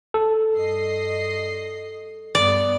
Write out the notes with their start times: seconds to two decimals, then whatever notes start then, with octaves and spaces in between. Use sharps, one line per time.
0.14 A4
0.54 G2 D#5 C7
2.35 G2 B3 D5